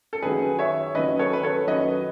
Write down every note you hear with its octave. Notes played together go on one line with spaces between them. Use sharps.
A4
F#2 D#3 F#3 G#4 B4
C#5 E5
F#2 D#3 F#3 B4 D#5
A4 C#5
B4
A4 C#5
F#2 D#3 F#3 B4 D#5